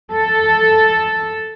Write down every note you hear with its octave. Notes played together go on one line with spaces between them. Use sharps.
A4